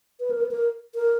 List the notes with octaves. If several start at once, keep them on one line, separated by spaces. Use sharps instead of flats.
B4
A#4
B4
A#4
A#4